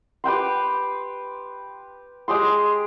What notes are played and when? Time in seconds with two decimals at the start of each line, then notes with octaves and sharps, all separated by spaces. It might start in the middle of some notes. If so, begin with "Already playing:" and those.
0.24 G4 B4 G5 C6
2.28 G#3 G4 G#4 C6